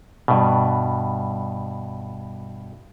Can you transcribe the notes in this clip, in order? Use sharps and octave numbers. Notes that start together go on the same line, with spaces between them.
G2 B2